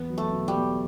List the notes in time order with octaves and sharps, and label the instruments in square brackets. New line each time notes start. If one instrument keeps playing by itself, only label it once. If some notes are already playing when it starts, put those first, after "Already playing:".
Already playing: [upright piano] E2 [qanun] B3
[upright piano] F#3
[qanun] A3
[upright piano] B2
[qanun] G3
[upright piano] E2